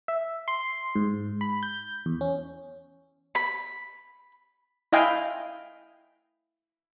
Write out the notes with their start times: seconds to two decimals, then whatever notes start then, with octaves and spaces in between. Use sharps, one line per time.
0.08 E5
0.48 C6
0.95 G#2
1.41 B5
1.63 G6
2.06 E2
2.21 C#4
3.35 B5
4.92 E4 D#5 F5 G5 G#5